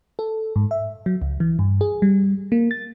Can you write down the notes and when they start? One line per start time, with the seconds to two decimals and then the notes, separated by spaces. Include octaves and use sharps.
0.19 A4
0.56 G#2
0.71 E5
1.06 F#3
1.22 C#2
1.40 E3
1.59 G2
1.81 G#4
2.02 G3
2.52 A#3
2.71 A6